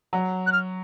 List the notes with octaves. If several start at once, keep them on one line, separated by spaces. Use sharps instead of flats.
F#3
F#6
F6